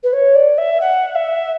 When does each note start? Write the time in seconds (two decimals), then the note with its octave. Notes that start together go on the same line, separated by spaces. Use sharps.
0.03 B4
0.12 C#5
0.35 D5
0.57 E5
0.80 F#5
1.15 E5